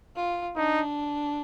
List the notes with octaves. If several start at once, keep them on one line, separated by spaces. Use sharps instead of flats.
F4
D4 D#4